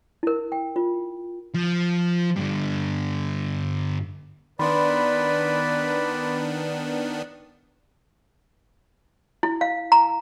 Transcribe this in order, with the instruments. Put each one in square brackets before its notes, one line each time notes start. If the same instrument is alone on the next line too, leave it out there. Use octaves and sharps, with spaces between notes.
[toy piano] E4 A#4
G5
F4
[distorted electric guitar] F3
G2 D3
[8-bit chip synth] D#3 B3 D4 [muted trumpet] B4 [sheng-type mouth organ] D5 [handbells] B5 C6
[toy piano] E4
F5
A#5